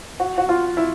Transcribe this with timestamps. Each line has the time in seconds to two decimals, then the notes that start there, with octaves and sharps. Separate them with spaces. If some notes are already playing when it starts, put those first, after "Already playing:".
0.20 F#4
0.38 F#4
0.49 F4
0.77 E4